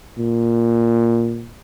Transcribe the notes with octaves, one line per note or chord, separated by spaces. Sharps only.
A#2